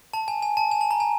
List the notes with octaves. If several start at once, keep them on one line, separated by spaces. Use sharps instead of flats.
A5
G#5
G#5
A5
G#5
A5
A#5
G#5